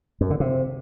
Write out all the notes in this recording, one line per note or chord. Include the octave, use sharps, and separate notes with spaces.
F#2
D3
C3